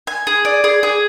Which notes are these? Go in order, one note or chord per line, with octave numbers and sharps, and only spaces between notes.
G#5
G#4
D5
G#4
G#4